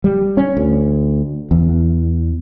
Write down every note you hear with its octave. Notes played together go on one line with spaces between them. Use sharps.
G3
C#4
D2
E2